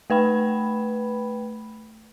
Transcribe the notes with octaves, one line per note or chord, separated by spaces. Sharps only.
A3 B4 G5 B5